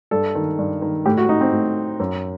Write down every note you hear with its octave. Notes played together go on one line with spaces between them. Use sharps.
G2 A4
D#3
G2
D#3
A2 G4
F#4
D#4
C4
A2
F#2